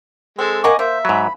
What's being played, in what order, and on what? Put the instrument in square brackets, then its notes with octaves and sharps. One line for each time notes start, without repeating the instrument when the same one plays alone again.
[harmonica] G#3 A4 [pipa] C4
[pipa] A#3 A#4 F#5 [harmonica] D#5 [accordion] G#5 C#6 D6
[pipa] A#3 [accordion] C5 [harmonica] E5
[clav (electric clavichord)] G#2 F#3 [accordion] B5